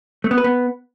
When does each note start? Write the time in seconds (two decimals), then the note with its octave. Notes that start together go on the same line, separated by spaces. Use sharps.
0.24 A3
0.31 B3
0.38 B4
0.44 B3